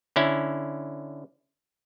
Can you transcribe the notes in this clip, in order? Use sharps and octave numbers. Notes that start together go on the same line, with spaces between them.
D3 C#4 E4